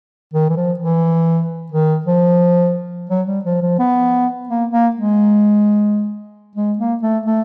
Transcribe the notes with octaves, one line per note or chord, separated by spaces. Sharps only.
D#3
E3
F3
E3
D#3
F3
F#3
G3
F3
F3
B3
A#3
A#3
G#3
G#3
A#3
A3
A3